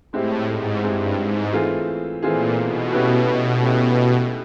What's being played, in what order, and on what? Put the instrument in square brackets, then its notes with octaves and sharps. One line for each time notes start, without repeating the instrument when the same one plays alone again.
[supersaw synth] A2 [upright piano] G#3 C4 E4 G4
[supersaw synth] G#2
[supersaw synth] G2 [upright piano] G#3 C4 E4 G4
[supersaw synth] G#2
[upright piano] E3 A3 C4 F4 G#4
[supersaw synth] A#2 [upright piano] E3 A3 C4 F4 G#4
[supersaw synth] B2
[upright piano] A3 C#4 E4 G4 B4
A3 C#4 E4 G4 B4